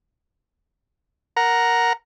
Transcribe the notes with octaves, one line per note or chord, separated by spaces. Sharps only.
A#4 F#5 A#5